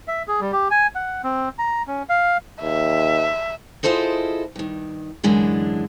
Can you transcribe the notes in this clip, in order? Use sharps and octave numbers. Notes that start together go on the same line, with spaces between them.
E5
G#4
G3
G4
G#5
F#5
C4
A#5
C#4
F5
D#2 E5
E4 F4 G#4 A4 C5 D#5
G2 D#3
F#2 D3 E3 G#3 D4